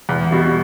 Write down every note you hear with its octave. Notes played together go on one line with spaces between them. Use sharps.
E2
B2 G3